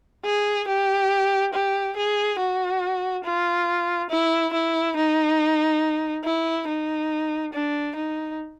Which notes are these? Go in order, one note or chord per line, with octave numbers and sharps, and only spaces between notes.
G#4
G4
G4
G#4
F#4
F4
E4
E4
D#4
E4
D#4
D4
D#4